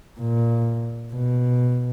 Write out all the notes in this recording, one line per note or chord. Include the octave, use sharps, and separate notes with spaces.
A#2
B2